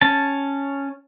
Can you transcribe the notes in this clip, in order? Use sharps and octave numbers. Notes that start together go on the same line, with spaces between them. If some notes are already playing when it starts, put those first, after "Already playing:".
C#4 A5